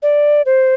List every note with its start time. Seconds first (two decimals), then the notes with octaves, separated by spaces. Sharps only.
0.03 D5
0.46 C5